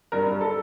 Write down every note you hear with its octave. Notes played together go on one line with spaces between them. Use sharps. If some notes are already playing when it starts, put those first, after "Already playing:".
G2 A#4 A#5
G2
A4 A5